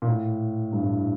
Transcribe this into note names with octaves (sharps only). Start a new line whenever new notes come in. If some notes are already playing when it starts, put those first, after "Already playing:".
A#2
A2
G2
A2